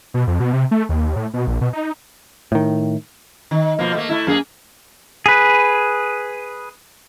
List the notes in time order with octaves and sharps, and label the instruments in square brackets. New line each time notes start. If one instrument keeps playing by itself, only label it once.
[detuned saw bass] B2
F2
B2
C3
A3
D#2
A2
B2
A#1
B2
D#4
[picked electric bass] A2 D#3
[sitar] D#3
B2 F3 A#3
A3 A#3
A3 E4
F#2 A#3 G#4
[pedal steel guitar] G#4 B4